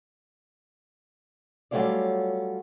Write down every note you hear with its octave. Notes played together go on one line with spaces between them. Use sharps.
F#3 G3 A3 C#4 F4 D5